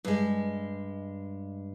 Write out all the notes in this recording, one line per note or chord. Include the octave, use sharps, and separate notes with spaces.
G2 G#3